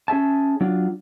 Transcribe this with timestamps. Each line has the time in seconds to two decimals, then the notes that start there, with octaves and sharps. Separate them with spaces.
0.08 C#4 G#4 E5 A5
0.61 F#3 D4 F4